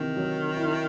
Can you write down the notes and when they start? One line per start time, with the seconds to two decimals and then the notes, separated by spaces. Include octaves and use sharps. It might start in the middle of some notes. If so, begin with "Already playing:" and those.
Already playing: C3 D#3 E3
0.17 F#3
0.57 E4